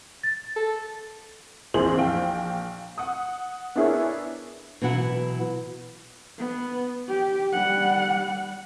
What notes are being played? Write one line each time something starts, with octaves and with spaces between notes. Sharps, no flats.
A6
A4
A#1 F2 E3 G#4 C5 F#7
A#1 F5 G5
F#5 D#6
B3 D4 E4 G#4 A#4 C#5
B2 E3 F#3 E4 F#5
B3
G4
G3 F#5